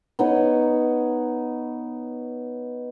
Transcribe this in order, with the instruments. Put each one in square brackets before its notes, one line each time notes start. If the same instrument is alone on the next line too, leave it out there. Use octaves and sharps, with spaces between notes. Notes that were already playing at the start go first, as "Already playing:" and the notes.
[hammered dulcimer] B3 D#4 C#5